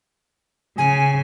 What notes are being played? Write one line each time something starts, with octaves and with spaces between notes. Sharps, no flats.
C#3 G#5